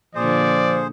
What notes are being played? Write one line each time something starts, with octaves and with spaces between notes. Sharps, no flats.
A#2 D3 F3 G#4 C5 D5